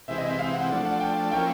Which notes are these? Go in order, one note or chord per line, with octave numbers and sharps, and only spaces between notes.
C3 E3 G#3 C4 E4 E5
D#5
E5
F5
F#5
F3 A3 D4 F#5
F#5
G5
F3 A#3 C#4 E4 G5